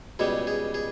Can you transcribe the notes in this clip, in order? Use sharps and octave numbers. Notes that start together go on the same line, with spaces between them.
C#2 B2 G3 G#4
G#4
G#4